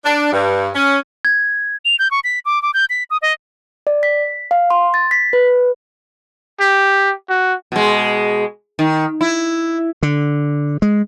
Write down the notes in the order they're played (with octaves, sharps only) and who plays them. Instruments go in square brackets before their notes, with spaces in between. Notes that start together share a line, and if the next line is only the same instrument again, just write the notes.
[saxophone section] D4
G2
C#4
[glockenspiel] G#6
[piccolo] F7
G6
C#6
B6
D6
D6
G6
B6
D#6
D#5
[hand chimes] D5
B6
F5
C6
A6
B6
B4
[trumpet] G4
F#4
[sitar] B2 G#3
D#3
E4
[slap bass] D3
G#3